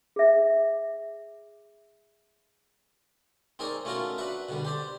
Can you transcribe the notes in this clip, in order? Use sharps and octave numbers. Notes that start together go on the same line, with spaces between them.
G#4 E5
C4 D#4 G#4 A#4 C#5 D5
A3 C#4 F4 F#4 A4 A#4
D4 F#4 B4 E5
B2 D3 G3
G4 C5 D5